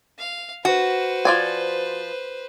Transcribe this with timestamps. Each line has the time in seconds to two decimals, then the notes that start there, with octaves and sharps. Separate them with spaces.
0.19 F5
0.65 F#4 B4 C5
1.25 F3 D5 G#5